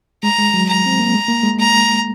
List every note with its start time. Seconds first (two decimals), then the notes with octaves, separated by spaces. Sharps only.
0.23 G#3 A#5
0.38 G#3
0.54 F#3
0.69 A#5
0.86 C4
1.00 A#3
1.14 G#3
1.28 A#3
1.43 G#3
1.59 A#5